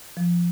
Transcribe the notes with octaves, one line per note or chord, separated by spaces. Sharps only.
F3